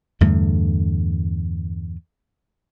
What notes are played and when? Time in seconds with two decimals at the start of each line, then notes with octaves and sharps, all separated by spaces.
0.21 E2 G2 D3 A3